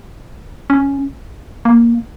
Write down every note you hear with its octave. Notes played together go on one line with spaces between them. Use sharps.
C#4
A#3